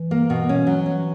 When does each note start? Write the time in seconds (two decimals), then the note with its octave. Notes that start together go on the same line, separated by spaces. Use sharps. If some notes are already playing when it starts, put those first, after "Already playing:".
Already playing: E3
0.11 A#3
0.30 B2
0.49 C#4
0.67 F#3
0.86 C#4